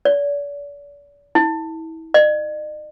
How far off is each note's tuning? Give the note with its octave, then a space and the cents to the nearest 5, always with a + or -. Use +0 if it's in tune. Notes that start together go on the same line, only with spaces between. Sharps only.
D5 -40
E4 -35
D#5 -45